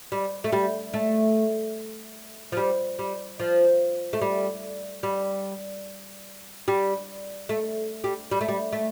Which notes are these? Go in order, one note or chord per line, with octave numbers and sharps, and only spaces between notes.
G3
A3
G3
A3
F3
G3
G3
F3
A3
G3
G3
G3
A3
G3
G3
A3
G3
A3